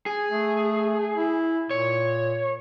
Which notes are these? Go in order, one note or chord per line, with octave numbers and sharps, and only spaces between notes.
G#4
A3
E4
A#2 C#5